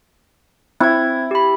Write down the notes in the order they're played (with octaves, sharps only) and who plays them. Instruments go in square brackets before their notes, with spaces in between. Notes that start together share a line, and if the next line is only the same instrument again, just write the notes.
[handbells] C4 G#6 [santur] E4
[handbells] G4 B5